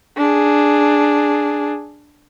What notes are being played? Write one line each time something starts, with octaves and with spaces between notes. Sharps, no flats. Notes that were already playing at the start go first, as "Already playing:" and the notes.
D4 G#4